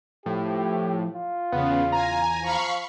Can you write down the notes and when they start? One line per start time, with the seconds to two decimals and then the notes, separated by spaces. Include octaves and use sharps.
0.26 A2 F3 G4
1.16 F4
1.52 E2 C#3 B3
1.92 G#5 A#5
2.42 F3 F5 B5 C#6